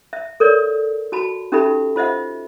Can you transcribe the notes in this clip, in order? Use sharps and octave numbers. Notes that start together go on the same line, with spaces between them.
E5
A4 A#4 C#5 D5
F#4 A5 B5
C#4 D#4 G4 A4 E5 B5
F4 C5 D#5 E5 F#5